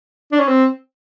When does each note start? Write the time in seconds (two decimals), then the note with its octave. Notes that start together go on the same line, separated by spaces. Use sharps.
0.32 D4
0.40 C#4
0.48 C4